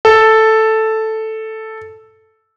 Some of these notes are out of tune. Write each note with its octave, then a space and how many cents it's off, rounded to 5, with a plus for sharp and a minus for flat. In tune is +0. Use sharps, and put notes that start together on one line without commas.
A4 +0